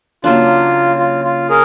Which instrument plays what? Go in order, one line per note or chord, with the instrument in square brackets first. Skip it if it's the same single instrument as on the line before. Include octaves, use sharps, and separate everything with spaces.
[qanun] C#3 F#3 A#3 D4 [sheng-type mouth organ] F4
[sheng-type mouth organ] F4
F4
G#4 A#4